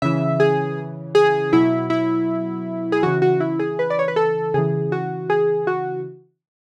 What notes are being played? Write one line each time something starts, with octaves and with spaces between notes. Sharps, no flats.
C#3 E3 E5
G#4
G#4
B2 F#3 E4
E4
G#4
C#3 E3 F#4
F#4
E4
G#4
B4
D5
C#5
B4
A4
C#3 E3 G#4
F#4
G#4
F#4